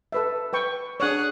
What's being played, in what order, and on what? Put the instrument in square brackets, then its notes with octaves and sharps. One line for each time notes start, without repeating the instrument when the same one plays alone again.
[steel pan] A4 B4 E5
B4 G5 C#6
[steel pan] D4 C#5 [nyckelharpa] G#4 F#5